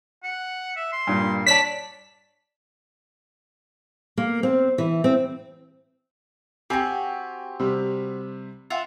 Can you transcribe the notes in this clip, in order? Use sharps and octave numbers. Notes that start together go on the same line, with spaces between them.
F#5
E5
C6
G2 A#2
D4 C#5 D5 A5 B6
A#3
C4
E3
C4
C4 F#4 G4 G#5
C3 G3
F4 E5 F#5